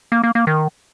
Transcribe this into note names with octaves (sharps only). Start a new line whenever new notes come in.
A#3
A#3
A#3
D#3